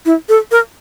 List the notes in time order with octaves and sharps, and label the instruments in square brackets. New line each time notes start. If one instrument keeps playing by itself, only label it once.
[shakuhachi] E4
A4
A#4